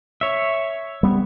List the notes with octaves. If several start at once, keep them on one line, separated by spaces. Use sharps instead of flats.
C#5 E5
G3 B3